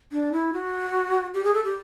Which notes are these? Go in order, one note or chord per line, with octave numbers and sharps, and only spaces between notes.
D4
E4
F#4
G4
G#4
A4
G4